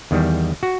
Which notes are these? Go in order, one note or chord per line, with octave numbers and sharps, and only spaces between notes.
E2 D#3 G3
F#4